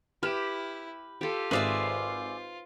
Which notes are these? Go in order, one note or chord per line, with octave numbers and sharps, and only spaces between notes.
E4 G4 B4 F6 E7
F4 G4 A4
G#1 G#4 B4 C5 D5 E5 F5